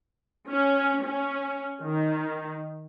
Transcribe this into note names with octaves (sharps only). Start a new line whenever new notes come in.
C#4
C#4
D#3